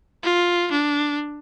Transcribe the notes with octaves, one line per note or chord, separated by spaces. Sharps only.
F4
D4